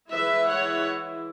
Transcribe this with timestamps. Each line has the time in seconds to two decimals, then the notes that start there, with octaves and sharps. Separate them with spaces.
0.10 E3 G#3 E4 B4 E5
0.48 C#5 F#5